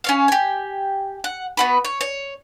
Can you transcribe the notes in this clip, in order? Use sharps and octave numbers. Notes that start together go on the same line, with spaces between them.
C#4 C#5 F5
G4 G#5
F#5
B3 F#4 B4
C#5
C#5